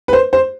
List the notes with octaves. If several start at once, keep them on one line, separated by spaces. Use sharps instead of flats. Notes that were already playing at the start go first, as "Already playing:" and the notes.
B4
C5
C5